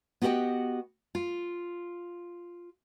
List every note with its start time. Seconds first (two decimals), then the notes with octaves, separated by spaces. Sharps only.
0.22 B3 F#4 G4 A#4 D#5 G5
1.15 F4